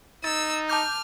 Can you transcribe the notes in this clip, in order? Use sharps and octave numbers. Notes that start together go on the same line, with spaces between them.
D#4 E6 A6
A5 D6 F6 G6